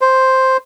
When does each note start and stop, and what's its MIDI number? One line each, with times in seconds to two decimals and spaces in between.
0.01 0.57 72